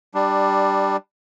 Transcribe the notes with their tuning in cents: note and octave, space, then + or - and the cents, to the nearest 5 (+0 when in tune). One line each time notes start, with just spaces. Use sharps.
G3 +0 D4 +15